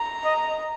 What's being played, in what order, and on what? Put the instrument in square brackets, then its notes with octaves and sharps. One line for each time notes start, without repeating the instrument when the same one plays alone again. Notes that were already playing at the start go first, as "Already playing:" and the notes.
Already playing: [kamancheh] A#5
[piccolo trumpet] D#5